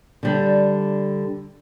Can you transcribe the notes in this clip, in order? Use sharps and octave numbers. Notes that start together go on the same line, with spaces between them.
D3 G3 D4